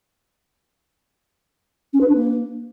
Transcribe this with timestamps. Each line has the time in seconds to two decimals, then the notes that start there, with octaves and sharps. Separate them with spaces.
1.93 C#4
2.00 B4
2.08 D4
2.15 A#3